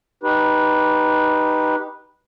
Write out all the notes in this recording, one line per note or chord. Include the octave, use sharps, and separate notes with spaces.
D#4 G4 B4